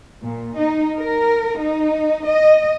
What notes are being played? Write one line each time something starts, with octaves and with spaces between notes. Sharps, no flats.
A#2
D#4
A#4
D#4
D#5